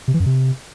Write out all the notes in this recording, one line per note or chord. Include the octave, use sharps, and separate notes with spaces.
C3
E3
F#2
C3